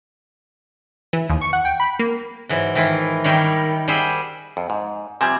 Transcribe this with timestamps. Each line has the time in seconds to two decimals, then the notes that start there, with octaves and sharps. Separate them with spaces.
1.13 E3
1.29 D#2
1.41 C#6
1.53 F#5
1.65 G5
1.80 B5
1.99 A#3
2.49 G#2 E3 F#3
2.75 D#3 E3 E4 F4
3.24 D#3 G3 E4 A#4 C#5
3.88 G3 G#4 C5 E5 F#5
4.57 F2
4.70 G#2
5.21 C3 F3 G3 C4 G#5